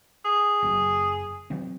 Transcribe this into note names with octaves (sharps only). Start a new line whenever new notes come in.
G#4
F#1 F#2
E3 F#3 C4